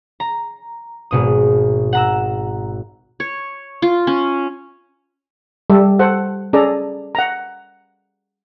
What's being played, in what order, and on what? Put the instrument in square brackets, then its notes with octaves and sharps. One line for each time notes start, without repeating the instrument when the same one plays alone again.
[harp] A#5
G#1 B2 D#6
F#5 A#5 E6
[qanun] C#5
F4
C#4
[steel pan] G3 A4 E5
A4 C5 F#5
C#4 G#4 A4 D5 A#5
F#5 A#5